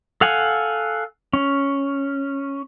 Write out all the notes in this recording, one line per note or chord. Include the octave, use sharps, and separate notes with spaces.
A4 F5 F#5 G#5
C#4